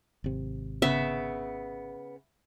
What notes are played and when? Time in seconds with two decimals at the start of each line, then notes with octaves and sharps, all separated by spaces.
0.24 G#1 C3
0.82 C#3 B3 E5